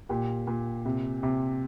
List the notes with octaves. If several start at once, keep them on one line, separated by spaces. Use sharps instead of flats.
A#2 G4
A#2
C3
C3